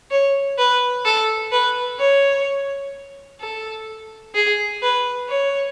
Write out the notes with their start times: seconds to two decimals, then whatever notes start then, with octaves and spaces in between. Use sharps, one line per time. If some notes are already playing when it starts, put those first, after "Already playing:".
0.10 C#5
0.58 B4
1.05 A4
1.52 B4
1.99 C#5
3.40 A4
4.35 G#4
4.82 B4
5.29 C#5